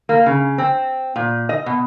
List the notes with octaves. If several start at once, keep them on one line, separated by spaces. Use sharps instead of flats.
A#3
C#3
C4
A#2
D#5
B2